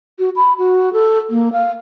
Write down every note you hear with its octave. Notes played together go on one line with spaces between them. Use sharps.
F#4
B5
F#4
A4
A#3
F5